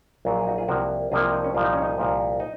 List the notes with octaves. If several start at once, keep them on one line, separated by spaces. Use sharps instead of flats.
A#1 A#2 F#3
G#4
D#4 F#4
F4 G#4
C2 C3 F3 A#3 F#4 A#4
C2 C3 F3 A#3 F4 G#4
F4 G#4
D#4
C#4
C2 A#2 F3 F4
D#4
C#4
D#4
C2 A#2 F3
D#4